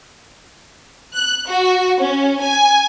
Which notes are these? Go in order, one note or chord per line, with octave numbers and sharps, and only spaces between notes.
F#6
F#4
C#4
G#5